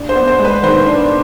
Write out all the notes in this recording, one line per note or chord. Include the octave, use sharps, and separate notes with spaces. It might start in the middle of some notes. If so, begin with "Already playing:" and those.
Already playing: D4
C5
B3
C5
G#3
B4
D#3 C5
D4